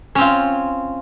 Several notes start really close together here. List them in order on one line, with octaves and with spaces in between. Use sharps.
C#4 C4 F4